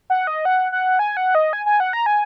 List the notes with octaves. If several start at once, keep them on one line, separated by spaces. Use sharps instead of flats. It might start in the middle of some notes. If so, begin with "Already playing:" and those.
F#5
D#5
F#5
F#5
G#5
F#5
D#5
G#5
G#5
F#5
A#5
G#5